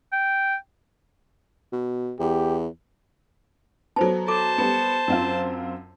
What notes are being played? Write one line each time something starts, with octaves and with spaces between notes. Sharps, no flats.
G5
B2
E2 G4
F#3 B3 A4 C5 A5
A4 C5 A5 D6
G3 B3
F#2 C4 F4